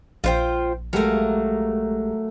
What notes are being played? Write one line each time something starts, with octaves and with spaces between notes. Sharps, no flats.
A#1 F4 C5 G5
F#3 G#3 A3 G4 G#4 A#4 F5